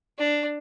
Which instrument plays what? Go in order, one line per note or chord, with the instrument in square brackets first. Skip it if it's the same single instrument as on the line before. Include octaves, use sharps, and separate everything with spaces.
[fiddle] D4